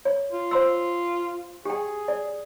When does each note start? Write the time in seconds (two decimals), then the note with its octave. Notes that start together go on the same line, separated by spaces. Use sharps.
0.05 C#5
0.31 F4
0.51 C5 C6 E6
1.65 G4 G#4 G5
2.08 D5